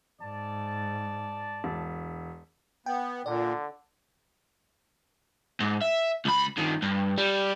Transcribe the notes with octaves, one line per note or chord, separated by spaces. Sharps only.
G#2 D5 A5
E1
B3 G5
A#2 D3 D5
G#2
E5
C#2 B5
G2 D#3
G2
G3